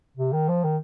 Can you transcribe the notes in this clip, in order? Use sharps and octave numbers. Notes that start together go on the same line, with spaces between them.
C3
D#3
F3
D#3